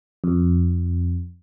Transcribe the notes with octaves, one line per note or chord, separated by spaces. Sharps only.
F2